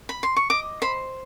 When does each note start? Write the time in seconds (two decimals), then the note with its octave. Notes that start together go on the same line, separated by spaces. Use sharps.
0.09 B5
0.23 C6
0.36 C#6
0.50 D#5 D6
0.82 C5 B5